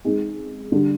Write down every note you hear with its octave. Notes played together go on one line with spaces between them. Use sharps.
G#3 C4 D#4 G#4
D3 G3 D4 G4